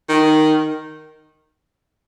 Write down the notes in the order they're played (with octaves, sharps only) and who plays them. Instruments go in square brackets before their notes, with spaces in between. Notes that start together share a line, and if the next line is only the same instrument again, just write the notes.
[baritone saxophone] D#3